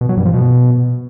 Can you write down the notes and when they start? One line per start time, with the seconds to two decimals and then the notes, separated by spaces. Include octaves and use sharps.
0.01 B2
0.09 F#3
0.17 G2
0.25 F3
0.34 B2